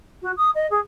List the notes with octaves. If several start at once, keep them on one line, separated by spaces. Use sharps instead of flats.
F#4
D#6
D#5
G#4